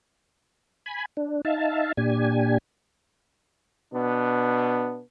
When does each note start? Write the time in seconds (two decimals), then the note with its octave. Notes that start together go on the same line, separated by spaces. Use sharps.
0.86 G#5 B5
1.17 D4
1.45 D#4 E5 F5 A5
1.97 A#2 D4 G4 G#5
3.93 B2 B3 D4